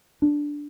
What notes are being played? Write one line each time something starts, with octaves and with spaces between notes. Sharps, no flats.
D4